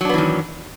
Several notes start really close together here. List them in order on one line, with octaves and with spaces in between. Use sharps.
F#3 D4 B3 E3 D#3